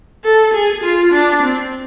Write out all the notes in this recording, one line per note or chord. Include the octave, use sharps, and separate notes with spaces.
A4
G#4
F4
D4
C4